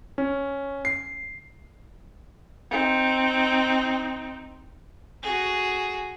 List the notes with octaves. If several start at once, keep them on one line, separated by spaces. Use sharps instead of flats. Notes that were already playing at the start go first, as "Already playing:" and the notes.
C#4
C7
C4 D#4
F#4 G#4